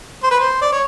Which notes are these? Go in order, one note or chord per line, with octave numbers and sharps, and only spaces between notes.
C5
B4
C5
D5
C#5